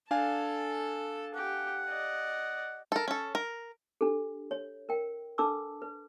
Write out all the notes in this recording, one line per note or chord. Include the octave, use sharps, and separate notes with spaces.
D4 A4 F5 G#5 A5
G4 F#5
D5 D#5
A4 A#4
C#4 A4
A#4
D4 G4 A4
C#5
A#4 G5
D4 A4 B4 A5 D6 E6
B4